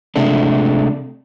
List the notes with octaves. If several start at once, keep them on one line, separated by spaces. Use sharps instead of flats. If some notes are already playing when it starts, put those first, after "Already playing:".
C3 G#3 A3 D4